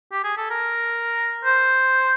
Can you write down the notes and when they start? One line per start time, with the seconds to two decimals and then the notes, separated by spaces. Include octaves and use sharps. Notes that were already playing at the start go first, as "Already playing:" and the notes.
0.12 G4
0.24 G#4
0.37 A4
0.50 A#4
1.45 C5